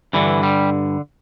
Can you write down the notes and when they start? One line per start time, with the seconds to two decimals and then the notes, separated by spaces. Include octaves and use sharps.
0.13 G2 D3 E3
0.43 G3